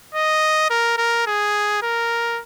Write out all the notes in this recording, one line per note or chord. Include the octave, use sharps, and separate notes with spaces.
D#5
A#4
A#4
G#4
A#4